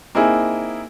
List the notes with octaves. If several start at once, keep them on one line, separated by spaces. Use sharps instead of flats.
A#3 C4 D#4 E4 G#4